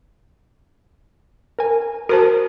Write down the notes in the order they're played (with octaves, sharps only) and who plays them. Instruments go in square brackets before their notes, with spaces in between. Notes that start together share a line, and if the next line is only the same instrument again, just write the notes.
[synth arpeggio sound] A#4 G#5
[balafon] F#4 C5 A5 [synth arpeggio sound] A#4